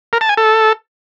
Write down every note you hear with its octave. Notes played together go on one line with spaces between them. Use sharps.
A#4
A5
G#5
A4